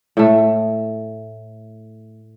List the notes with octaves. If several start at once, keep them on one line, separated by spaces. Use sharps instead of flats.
A2 A3